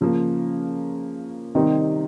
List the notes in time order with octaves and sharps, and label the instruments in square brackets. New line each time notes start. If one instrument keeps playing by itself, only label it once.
[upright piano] C#3 F3 A#3
C3 D#3 G3 C4 D#4